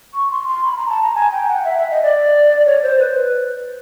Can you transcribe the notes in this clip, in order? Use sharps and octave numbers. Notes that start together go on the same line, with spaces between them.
C#6
C6
C6
B5
A#5
A5
A#5
G#5
G5
F#5
E5
E5
D#5
D5
C#5
C5
B4